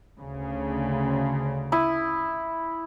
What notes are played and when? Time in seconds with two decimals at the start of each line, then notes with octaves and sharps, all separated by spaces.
0.20 D2 C#3
1.72 E4 D#6